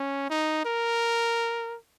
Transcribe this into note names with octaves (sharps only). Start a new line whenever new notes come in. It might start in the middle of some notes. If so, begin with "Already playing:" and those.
Already playing: C#4
D#4
A#4